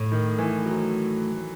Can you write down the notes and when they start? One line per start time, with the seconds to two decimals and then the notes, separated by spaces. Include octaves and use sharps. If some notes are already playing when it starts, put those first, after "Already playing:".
Already playing: A2
0.12 D#3
0.39 E3
0.65 F#3